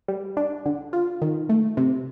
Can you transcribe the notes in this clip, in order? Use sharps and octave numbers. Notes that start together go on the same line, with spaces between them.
G3
D4
D3
F4
D#3
A3
C3